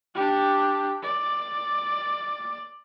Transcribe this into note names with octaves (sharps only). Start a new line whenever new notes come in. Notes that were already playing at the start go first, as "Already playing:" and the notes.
D4 G4
D5